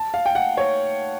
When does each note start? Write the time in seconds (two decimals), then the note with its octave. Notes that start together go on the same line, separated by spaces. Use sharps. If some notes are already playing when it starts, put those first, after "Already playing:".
Already playing: A5
0.14 F5
0.26 G5
0.35 F#5
0.57 C#5